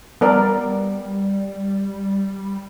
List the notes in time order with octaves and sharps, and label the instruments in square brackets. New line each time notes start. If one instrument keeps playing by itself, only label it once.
[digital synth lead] G3 [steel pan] B3 A#4 D5